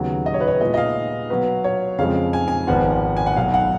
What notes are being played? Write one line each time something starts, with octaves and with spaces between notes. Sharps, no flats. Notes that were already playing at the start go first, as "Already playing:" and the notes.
Already playing: D#2 C#3 F#3 B3
D#5
C#5
B4
C#5
A#2 G#3 B3 F4 B4 D#5
D#5
F5
B2 F#3 B3 F#4 B4
C#5
F2 C#3 F3 G#3 F5
G#5
G#5
G#1 G#2 F3 B3 F4 F#5
G#5
F#5
B1 B2 F#3 F5
F#5